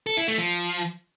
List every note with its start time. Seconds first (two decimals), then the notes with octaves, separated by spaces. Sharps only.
0.07 A4
0.17 E4
0.28 A3
0.38 F3